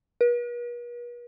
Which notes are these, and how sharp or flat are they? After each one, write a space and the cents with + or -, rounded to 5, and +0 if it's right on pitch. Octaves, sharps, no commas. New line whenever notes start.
B4 -45